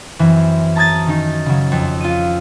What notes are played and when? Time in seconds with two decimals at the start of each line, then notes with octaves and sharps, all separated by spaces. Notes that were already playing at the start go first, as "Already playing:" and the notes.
0.19 F#2 E3 C4
0.76 A5 A#5 D#6 G#6 A6
1.07 D#3 C#4 D#4
1.46 C#3 F#3
1.72 F2
2.01 F4 D#7